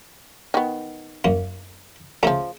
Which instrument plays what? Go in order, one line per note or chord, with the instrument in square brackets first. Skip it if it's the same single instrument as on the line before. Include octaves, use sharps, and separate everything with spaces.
[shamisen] D#3 B3
[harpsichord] F#2 A#3
[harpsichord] C#3 A3 [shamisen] F3 A#5